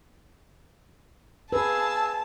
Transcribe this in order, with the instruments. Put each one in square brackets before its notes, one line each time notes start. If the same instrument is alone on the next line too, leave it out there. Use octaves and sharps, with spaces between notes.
[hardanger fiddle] G#4 F5 [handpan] B4 [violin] A5 [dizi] E6